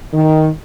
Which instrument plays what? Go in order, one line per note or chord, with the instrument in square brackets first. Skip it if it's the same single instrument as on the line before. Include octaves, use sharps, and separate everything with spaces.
[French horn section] D#3